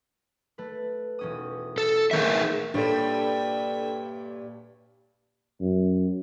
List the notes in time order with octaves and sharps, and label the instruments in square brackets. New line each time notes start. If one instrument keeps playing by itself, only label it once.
[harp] A3 B4
E1 C#4 D#6
[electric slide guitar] A4
[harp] D#3 E3 [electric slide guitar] G#4 A#4 E5
[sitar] G2 G3 [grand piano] A#2 C#5 [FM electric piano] D4 A4 [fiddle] E5 G5
[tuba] F#2